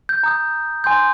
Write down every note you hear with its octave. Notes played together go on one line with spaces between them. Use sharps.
G6
A#5 D#6 G6
G#5 C6 G6